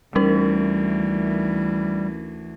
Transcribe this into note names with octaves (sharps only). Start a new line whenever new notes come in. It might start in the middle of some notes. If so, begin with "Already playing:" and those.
D2 E3 G3 C#4 D#4 A#4